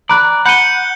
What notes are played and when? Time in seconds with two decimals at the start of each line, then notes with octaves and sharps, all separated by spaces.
0.09 D5 A#5 B5 F#6
0.45 F#5 B5 G6 C#7 D#7 G7